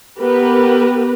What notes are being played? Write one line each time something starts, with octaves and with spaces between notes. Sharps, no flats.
B3 G4 A#4 B4